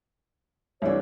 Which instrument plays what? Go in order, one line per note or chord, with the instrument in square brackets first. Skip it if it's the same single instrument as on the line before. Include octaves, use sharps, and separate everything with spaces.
[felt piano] C2 E3 D4 [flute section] G4 A4 C#5